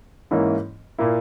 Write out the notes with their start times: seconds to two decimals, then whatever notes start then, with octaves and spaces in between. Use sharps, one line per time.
0.31 G#2 E3 A#3 C#4 E4
0.98 A#2 A#3 E4